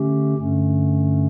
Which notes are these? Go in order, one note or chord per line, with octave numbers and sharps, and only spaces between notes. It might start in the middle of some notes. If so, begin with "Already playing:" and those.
Already playing: D3 A3 C#4 G4
G2 D3 A3 C#4